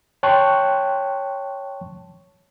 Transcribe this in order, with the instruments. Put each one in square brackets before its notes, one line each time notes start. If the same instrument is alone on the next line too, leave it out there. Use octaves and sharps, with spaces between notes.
[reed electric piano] C#5 G5 A5 C6 C#6 F#6